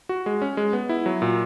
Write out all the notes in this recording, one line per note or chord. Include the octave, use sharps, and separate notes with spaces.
F#4
G#3
C#4
G#3
B3
E4
F#3
A#2